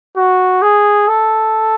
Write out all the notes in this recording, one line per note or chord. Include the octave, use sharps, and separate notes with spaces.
F#4
G#4
A4